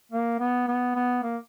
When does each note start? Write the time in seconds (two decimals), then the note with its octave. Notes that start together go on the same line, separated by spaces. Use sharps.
0.12 A#3
0.40 B3
0.67 B3
0.95 B3
1.23 A#3